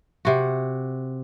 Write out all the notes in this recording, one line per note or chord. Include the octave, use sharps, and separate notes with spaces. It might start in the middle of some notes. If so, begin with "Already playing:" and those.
C3 F#4